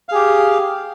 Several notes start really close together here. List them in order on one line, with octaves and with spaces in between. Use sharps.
F5 G#4 G4